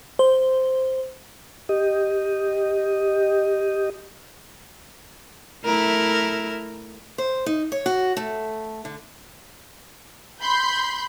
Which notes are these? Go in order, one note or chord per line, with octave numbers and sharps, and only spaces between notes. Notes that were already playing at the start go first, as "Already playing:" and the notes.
C5
G4 D#5
A3 E4 A#4
C5
D#4
C#5
F#4
A3
D3
B5 C6 G6